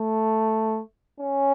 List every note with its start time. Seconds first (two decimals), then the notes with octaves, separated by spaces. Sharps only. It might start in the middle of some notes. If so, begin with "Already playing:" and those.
Already playing: A3
1.20 C#4